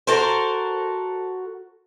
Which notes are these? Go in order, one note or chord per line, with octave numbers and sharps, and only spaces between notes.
F#4 A4 A#4 C5